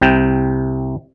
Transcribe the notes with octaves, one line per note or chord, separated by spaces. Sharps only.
C2 C3 G5